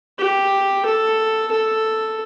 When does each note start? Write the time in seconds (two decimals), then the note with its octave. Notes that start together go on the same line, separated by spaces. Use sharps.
0.19 G4
0.85 A4
1.51 A4